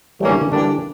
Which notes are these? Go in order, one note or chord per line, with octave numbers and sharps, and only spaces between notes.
A2 E3 G3 A#3 C#4
D3
D3
D3 E3 G3 A#3 D4